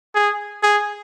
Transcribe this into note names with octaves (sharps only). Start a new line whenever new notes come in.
G#4
G#4